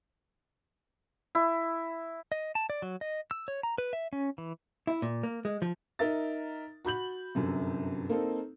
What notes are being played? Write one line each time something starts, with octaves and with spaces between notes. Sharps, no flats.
E4
D#5
A5
D5
F#3
D#5
E6
C#5
A#5
B4
E5
C#4
E3
E4
A#2
A#3
G#3
F3
D#4 A#4 E5 A6
F#4 B5 G6 F#7
G1 F#2 C3
A#3 C4 D#4 A4